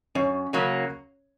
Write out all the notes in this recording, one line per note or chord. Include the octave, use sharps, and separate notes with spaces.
F#2 C#4 C#5
C#3 F#3 A#3